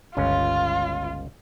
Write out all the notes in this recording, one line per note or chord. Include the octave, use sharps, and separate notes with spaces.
G1 C#2 C#4 F4